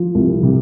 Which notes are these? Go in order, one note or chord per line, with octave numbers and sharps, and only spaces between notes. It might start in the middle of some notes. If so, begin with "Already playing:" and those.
Already playing: F3
C2
C3